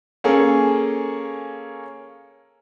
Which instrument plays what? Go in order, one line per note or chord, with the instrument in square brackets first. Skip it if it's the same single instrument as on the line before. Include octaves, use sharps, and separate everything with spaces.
[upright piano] A#3 C#4 G#4 A4